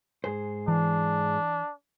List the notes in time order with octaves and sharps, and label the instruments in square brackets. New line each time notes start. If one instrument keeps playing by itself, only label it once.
[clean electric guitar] G#2 G#4 C5
[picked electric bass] E3 [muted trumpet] D4